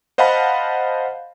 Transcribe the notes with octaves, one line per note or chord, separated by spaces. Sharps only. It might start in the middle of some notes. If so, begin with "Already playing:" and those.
C5 D#5 F5 F#5 A5 B5